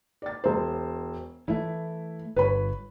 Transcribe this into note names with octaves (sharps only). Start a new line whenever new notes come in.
D5 A6
E1 C5
E3 A3 E4
G1 B4 C#5 B5